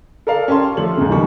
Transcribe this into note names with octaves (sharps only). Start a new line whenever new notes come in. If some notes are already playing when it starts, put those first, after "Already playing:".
A4 A#4 D5 F5
C#4 G4 D5 A5 C6
F3 A3 F#7
D#2 G#2 C#3
F1 D#3 E3 G3 C#6